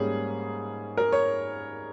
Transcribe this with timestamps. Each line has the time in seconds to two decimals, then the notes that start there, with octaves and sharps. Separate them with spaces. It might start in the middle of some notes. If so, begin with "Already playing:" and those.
Already playing: G#2 G3 A#3 C#4 G#4
0.97 A#4
1.12 C#5